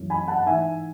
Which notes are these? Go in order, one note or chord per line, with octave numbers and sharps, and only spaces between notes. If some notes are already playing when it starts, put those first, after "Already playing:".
Already playing: F#2 E3
G#5 B5
F#5 A5
F#5
G#2 E3 E5 G#5